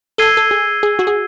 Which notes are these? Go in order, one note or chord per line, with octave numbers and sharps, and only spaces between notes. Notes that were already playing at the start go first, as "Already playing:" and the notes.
A4 E6 G#6 C7 D#7 G7
A4
G#4
G#4
F#4
G#4